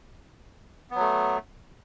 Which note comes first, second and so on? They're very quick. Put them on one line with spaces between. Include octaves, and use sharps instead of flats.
B3 F#3 A3